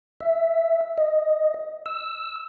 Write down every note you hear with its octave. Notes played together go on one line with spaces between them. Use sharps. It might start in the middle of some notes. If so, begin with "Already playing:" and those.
E5
D#5
E6